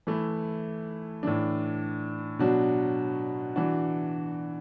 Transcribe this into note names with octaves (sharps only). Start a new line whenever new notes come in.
E3 A3 E4
A2 E3 D4
B2 F#3 D4 F#4
E3 D4 F#4